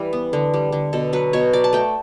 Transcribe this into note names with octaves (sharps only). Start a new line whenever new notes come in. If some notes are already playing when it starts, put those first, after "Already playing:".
Already playing: E3 G3
B3
D3
G3
D3
B2 A4
F#3 B4
B2 C#5
F#3 D5
A5
A3 G5